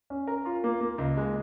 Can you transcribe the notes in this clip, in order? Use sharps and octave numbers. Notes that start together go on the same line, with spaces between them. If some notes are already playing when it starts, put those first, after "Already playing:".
C#4
A#4
F4
A#3
A#3
C#2
G#3